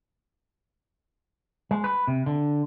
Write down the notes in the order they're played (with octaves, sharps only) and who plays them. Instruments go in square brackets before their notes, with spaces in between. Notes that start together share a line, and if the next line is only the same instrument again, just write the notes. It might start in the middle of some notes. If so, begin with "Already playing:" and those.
[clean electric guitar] G#3
B4
C3
D3